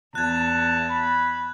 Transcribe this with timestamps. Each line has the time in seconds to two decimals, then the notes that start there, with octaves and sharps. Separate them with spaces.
0.15 E2 A5 F#6 G#6
0.90 B5